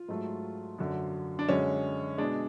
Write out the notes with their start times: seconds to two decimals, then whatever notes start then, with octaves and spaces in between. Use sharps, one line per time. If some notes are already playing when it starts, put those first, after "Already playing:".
Already playing: F4
0.09 G#2 F#3 A3
0.78 F#2 D3 F#3
1.39 D4
1.49 F#2 D3 G#3 C#4
2.18 B2 G#3 D4